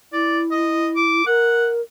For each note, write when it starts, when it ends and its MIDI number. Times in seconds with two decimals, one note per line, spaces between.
0.13 1.23 64
0.13 0.39 74
0.51 0.89 75
0.96 1.25 86
1.26 1.81 70
1.26 1.67 78